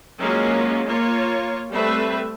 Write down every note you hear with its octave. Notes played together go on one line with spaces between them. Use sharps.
F#3 G#3 A#3 C#4 F4
A#3 F4 C#5
G3 A3 C4 B4 E5